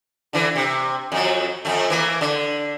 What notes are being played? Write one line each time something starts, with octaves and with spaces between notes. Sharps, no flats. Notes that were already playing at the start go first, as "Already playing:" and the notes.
D3 E3
C3
F2 F#3
F2 A3
E3 A#3
D3